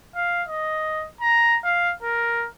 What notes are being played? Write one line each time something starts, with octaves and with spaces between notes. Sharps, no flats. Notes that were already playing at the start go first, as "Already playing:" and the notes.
F5
D#5
A#5
F5
A#4